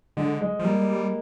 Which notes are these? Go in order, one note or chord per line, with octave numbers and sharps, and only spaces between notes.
D3 G#3
G#3
F3
G3 A#3